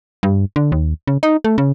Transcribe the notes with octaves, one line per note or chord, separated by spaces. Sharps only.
G2
D3
D#2
C#3
D#4
A3
C#3